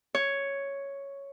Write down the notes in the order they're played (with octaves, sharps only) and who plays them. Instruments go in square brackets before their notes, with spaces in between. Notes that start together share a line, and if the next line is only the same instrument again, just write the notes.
[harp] C#5